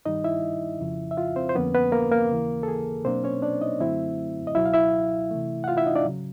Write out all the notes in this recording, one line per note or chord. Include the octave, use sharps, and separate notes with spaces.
G2 D#3 G3 D#4 D#5
E4 E5
F2 C#3 F3
E5
F4 F5
C4 C5
C5
F2 D3 F3 A#3 B3 C#4 B4
B3 B4
A#3 A#4
A#3 A#4
D#2 C#3 E3
A4
G#4
B2 F#3 A#3 C4 D4 C5
C#4 C#5
D4 D5
D#4 D#5
F#2 D3 F#3 A3 C4 E4 E5
D#5
C#2 B2 F#3 E4 E5
F5
E4 E5
C3 E3 A3
F#5
F4 F5
E4 E5
D#4 D#5
D4 D5
C#3 F#3